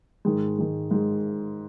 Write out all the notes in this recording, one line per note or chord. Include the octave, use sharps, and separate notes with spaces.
G#2 D#3 G#3
G#2 D#3 G#3
G#2 D#3 G#3